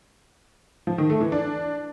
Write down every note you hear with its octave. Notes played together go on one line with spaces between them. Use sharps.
F3
D#3
A3
E3
D4